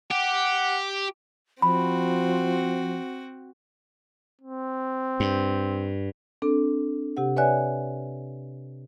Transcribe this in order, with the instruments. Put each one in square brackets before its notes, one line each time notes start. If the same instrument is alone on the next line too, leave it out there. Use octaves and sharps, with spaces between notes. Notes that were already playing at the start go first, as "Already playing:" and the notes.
[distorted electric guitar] G4 [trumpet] F#5
[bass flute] F3 [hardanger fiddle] C4 F#4 [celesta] B5
[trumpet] C4
[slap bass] G2
[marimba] C4 D4 A4
C3 G4 F#5
B4 C#5 D5 E5 G#5 F#6